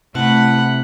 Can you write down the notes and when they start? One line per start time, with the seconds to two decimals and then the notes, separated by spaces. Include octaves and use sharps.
0.15 C3 A3 E4 E5 F#5 A5 B5